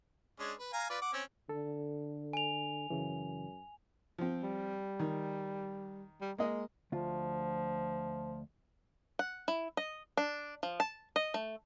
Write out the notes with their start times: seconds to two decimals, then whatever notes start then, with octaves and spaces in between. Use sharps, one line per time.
0.39 G#3 C#4 D4
0.59 B4
0.73 F5 G#5 A#5
0.90 F4 B4 D5
1.02 F#5 D6
1.14 C4 C#4
1.49 D3 A4
2.33 G#5 F7
2.90 F#2 C#3 E3
4.18 F3 C4
4.43 G3
5.00 D#3
6.21 G3
6.38 G#3 A#3 D#5
6.92 D2 F3 F4
9.19 F#5
9.48 E4
9.77 D#5
10.17 D4
10.63 F3
10.80 A5
11.16 D#5
11.34 A3